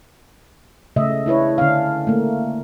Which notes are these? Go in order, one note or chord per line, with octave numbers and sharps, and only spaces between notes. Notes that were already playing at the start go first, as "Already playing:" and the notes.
C#3 A3 D#5 E5
D4 E4 B4 C#5
D3 C#4 D4 F5
A3 A#3